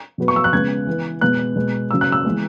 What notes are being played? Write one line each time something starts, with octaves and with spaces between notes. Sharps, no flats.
B2 F#3 B3
C#6
E6
F#6
C#3 G#3 B3 G#6
E3 B3
B2 G#3 B3 F#6
B2 G#3 B3
C#3 F#3 B3 E6
F#6
E6
E3 G#3 B3